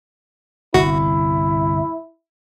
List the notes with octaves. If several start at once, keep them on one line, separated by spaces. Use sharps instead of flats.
G1 C2 E4 F#4